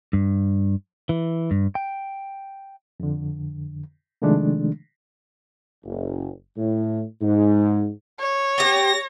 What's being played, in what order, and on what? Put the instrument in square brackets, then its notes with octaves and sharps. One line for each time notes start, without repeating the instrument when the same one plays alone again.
[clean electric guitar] G2
E3
G2
G5
[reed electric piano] F2 D3
C3 D#3 F3 G#3 A3 D4
[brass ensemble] F#1
A2
G#2
[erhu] C#5
[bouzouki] B3 G4 [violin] A#6